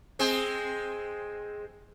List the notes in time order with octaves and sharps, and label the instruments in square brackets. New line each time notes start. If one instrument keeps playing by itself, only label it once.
[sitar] G#3 C4 G#4